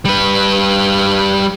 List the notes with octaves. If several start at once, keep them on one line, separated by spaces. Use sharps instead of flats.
G3 B4